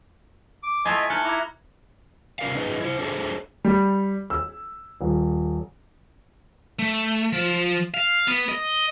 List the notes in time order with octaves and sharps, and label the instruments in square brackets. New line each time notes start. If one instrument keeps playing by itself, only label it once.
[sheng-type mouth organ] D6
[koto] A3 E4 F4 [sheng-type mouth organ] D#5 [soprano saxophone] G#5
[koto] D#4 [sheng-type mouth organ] G#5 [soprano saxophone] A5 [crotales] F6 F#6 C#7
[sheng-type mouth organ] E4 A#5 [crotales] D6 G#6
[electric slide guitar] C3 C#4 F4 A#4 D5 F5
C#4 D#4 G#4 B4 D#5
E4 C5
D4 G#4 A4 C5 C#5
[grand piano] G3
E6
D#1
[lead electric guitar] A3
F3
F5
B3
D#5